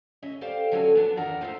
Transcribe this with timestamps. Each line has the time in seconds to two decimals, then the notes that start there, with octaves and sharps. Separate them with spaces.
0.22 C#3 C#4 D#5 E5
0.41 G4 A4 C5 D5 F5 G5
0.72 D3 F#3 C#4 F#4 A4 G#5
0.95 B3 D4
1.17 E2 D#3 F#3 D4 A#4 F#5
1.41 D#4 F4 C5 D5 E5